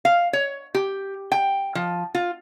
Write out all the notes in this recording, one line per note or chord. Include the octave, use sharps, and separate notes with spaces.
F5
C#5
G4
G5
F3
F4